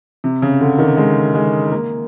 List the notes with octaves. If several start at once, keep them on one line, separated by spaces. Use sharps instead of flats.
C3
C#3
D3
D#3
G#3
G#3
A#3